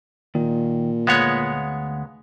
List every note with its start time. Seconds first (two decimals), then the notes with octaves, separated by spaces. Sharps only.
0.35 A#2 D#3
1.07 D2 G#3 B3 C#5 F5 F#5